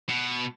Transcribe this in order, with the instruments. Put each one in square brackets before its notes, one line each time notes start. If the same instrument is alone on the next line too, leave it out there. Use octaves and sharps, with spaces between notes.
[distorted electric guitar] B2